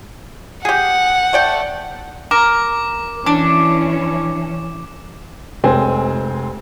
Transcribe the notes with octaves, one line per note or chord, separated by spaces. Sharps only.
G4 G#4 F#5
A3 D5 G5
A#4 D6
E3 C#4 D4
F1 G#3 C4 G#4 C#5 G#5